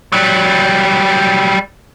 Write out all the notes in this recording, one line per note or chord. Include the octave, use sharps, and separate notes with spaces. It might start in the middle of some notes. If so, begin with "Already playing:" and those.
F#3 G3